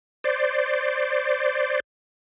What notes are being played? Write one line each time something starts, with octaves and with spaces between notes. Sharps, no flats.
C5 D5